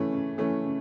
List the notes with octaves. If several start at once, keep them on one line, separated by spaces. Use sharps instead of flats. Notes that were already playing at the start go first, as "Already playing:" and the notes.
Already playing: E3 A3 C#4
C#3
E3 A3 C#4
C#3